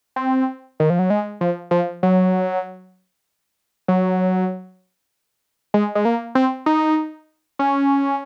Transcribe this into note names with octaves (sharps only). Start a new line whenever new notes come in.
C4
D#3
F3
F#3
G#3
F3
F3
F#3
F#3
G#3
G#3
A#3
C4
D#4
C#4